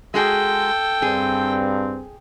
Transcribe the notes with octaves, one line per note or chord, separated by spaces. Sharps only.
G#3 F#4 G#4 A4 G5
G2 C4 G#4